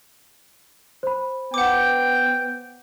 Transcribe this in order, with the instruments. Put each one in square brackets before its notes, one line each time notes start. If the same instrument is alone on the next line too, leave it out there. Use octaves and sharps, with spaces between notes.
[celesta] C5 B5
[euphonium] B3 [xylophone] F#5 D6 [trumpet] G5